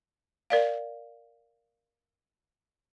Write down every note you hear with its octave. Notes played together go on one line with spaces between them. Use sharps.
A#4 D5 F5